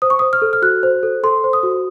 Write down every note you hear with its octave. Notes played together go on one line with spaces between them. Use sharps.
C5 D#6
C#6
C5 D#6
F6
A4
F6
F#4 F#6
C5
A4
A4 C6
C5
D#6
F#4